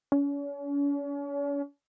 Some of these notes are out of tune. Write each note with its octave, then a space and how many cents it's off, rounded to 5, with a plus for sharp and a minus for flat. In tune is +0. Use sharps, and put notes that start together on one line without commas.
C#4 +40